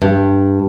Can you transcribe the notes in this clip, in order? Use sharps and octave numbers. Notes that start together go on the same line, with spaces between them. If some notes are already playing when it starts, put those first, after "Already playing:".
G2